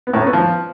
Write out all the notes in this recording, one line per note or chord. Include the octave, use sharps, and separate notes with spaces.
B3
A2
C#4
B3
F3